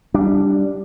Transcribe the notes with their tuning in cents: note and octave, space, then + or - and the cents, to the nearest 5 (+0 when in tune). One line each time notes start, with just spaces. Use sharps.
G3 +0 D4 -5